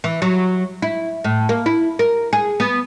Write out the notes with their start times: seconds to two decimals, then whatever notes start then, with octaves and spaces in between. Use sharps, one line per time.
0.04 E3
0.22 F#3
0.82 E4
1.24 A2
1.49 A#3
1.66 E4
1.99 A#4
2.33 G#4
2.60 B3